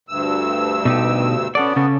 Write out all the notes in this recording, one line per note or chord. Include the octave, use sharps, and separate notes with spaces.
D2 G2 E6
B2 D#4 G4
B3 C#4 A4 D5
C#3 C#4 A4